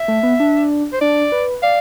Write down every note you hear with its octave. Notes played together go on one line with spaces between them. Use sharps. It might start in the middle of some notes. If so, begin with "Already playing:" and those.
Already playing: E5
A3
B3
D4
C5
D4 D5
B4
D5 F5